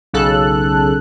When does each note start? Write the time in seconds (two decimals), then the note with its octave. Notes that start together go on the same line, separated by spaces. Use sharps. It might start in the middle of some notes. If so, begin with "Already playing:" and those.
0.13 B1 C#3 A4 F#6